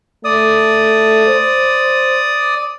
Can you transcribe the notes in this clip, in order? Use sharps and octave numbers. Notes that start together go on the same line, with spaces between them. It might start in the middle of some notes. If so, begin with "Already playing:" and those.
A3 D5 D#6
C5